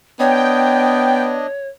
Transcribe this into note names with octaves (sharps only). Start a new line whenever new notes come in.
B3 D4 C#5 D#5 G5